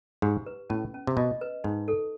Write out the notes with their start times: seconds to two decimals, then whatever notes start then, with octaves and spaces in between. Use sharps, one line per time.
0.22 G#2 G4
0.46 B4
0.70 A2 C#4
0.94 C#4
1.07 C3
1.17 B2 D#5
1.41 B4
1.64 G#2 D#4
1.88 A4